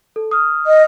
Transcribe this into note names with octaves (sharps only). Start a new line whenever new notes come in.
A4
D#6 F6
D#5